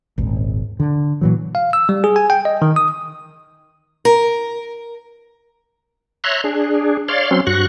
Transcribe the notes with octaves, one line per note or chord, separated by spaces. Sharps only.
D#1 G#1
D3
A#2 E3 F#3
F5
E6
G3
G#4
G#5
G5
D#5
D#3
D#6
A#4
C#5 E5 A#5 C6 F#6
D4 G#4
C#5 D5 F5 C6
F#3 C4 C#4 C6
G2 F#4 C#6 F#6